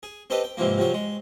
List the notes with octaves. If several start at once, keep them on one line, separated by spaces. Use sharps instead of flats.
G#4
C4 G4 A4 B4 D#5
G5
G#2 C3 E3 F3 A#3
C3 F3 F#3 C#5
G#3